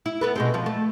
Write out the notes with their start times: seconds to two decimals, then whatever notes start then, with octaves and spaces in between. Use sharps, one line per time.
0.06 E4
0.21 B3 A4 B4
0.36 B2 G#3 C4
0.54 F3 F4
0.66 A3